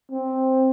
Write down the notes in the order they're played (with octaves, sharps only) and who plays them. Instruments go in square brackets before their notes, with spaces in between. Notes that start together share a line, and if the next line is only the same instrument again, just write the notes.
[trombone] C4